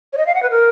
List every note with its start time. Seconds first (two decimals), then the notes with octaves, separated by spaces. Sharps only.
0.13 C#5
0.18 D#5
0.26 F5
0.35 F#5
0.43 B4
0.50 A#4